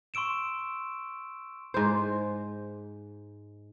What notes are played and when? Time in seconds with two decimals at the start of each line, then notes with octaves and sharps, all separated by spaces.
0.14 C6 C#6 E6 D7 E7
1.74 G#2 C5